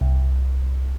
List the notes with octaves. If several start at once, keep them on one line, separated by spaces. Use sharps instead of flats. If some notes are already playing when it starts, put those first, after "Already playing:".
C2